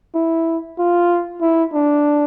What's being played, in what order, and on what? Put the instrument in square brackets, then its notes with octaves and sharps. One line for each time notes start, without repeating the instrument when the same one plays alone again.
[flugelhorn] E4
F4
E4
D4